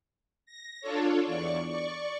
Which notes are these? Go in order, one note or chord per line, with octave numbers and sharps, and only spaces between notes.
A#6
D4 F4 A4 C#5
E2 D5 C#6
D5 C#6